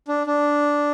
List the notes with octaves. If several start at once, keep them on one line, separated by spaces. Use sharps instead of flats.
D4
D4